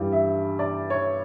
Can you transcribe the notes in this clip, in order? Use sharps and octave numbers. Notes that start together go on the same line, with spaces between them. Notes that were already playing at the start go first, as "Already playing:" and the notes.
Already playing: G2 E3 G3
E5
D5
C#5